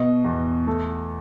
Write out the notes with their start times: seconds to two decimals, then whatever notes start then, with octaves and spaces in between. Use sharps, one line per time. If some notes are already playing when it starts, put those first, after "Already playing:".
Already playing: B2 D#5
0.24 E2
0.67 A3